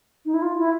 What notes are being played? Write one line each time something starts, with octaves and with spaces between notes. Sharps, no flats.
D#4
E4
F4
E4